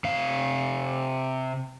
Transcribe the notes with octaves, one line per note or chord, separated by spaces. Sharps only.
C3 F5